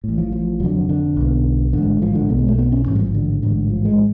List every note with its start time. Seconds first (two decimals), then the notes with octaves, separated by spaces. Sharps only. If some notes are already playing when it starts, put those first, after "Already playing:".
0.04 A1 A2
0.18 F3
0.32 F3
0.60 F1 F2 D3 F#3
0.89 D3
1.17 B1 B2
1.73 A1 G#2 D3
2.02 F3
2.15 D3
2.29 B1 B2 B3
2.39 G#3
2.48 A3
2.58 B3
2.72 C#4
2.86 A1 G#2 C#4
2.95 F#3
3.00 F3
3.14 D3
3.43 A1 G#2 D3
3.70 F3
3.85 G#3